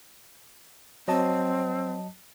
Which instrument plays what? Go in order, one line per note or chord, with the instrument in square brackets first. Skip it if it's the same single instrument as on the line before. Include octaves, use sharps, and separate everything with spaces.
[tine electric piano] F#3 D#5 A5 [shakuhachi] C4